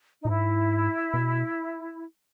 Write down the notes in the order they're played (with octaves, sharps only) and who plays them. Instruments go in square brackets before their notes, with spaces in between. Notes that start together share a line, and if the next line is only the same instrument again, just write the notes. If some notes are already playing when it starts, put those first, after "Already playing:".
[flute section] D#4
[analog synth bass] A#2
[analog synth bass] G#2 [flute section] E4
[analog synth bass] B2